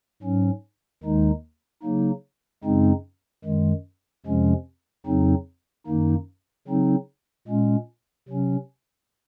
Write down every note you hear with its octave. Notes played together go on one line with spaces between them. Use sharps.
G#2 F#3 C#4
D#2 D#3 G#3 D#4
C#3 F#3 A#3 D#4
F#2 C#3 G#3 C4 D#4
F#2 D#3 G#3
F2 C3 F3 G#3 C#4
F2 C#3 F#3 C4 D#4
F#2 D#3 A#3 D#4
C#3 F#3 C4 D#4
A#2 G#3 C#4
C3 F#3 C#4